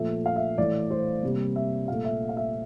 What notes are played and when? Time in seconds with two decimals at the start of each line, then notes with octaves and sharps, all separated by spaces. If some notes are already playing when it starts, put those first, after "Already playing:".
Already playing: A#2 F3 A3 E5
0.26 F5
0.36 E5
0.58 A2 E3 A3 D5
0.91 C5
1.23 C3 G3 A#3
1.56 E5
1.88 A#2 A3 F5
2.05 E5
2.29 F5
2.37 E5